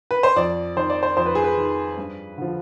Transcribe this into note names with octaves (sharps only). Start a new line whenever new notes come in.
B4
C5
F2 D5
D#3 C5
D5
C5
F2 C5
B4
G#4
B4
D#3
G2
D3 F3